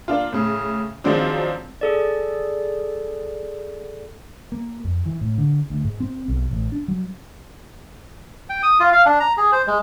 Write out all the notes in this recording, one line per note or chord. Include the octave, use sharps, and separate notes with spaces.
A#3 D4 F4
A2 C#3
D#3 F3 F#3 G#3 C4 D4
G#4 A4 D5
A#3
F2
E3
A2
D3
D2
G#2
C4
B1
A1
D4
F#3
G5
D#6
F4
F5
D4
A#5
G#4
C5
G#3